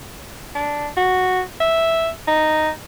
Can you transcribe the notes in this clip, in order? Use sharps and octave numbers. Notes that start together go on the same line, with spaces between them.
D4
F#4
E5
D#4